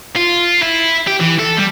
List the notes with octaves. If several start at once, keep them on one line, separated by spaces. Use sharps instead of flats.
F4
E4
G4
E3
A4
G3